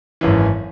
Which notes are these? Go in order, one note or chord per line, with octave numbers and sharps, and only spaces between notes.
G#1 F#2 E3